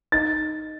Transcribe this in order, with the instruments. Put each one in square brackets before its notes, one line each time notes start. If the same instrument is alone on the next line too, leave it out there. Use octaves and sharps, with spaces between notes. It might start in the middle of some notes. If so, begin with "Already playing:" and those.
[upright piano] D#4 [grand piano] A6